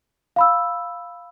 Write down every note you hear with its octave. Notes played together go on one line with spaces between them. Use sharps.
F5 B5 E6